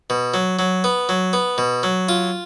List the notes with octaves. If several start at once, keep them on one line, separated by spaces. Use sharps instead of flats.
B2
F#3
F#3
B3
F#3
B3
B2
F#3
F4